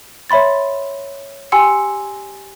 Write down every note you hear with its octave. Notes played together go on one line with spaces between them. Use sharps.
C#5 E5 B5 C6 A6
G4 G5 G#5 C6 E6 C#7